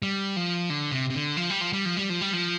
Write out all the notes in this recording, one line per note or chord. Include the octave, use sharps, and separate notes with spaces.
G3
F3
D3
C3
C3
D3
F3
G3
F3
G3
F3
G3
F3
G3
F3